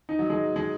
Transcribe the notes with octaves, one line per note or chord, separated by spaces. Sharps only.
D#4
F#3
G#3
G#3